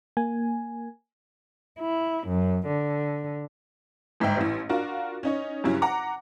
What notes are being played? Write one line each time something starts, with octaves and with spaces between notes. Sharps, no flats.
A#3 G#5
E4
F#2
D3
G1 G#2 D#4 E5 G5
A1 E4
D4 F4 F#4 A#4
C#4 D#4 C#5
G2 C#3 F#3 C#4 E4
F#5 A#5 D6